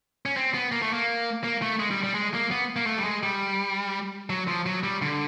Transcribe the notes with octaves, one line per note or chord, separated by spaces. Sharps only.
C#4
C4
B3
A#3
A3
A#3
A#3
A3
G#3
G3
G3
G#3
A#3
B3
A#3
A3
G3
G#3
G3
F#3
F3
F#3
G3
D3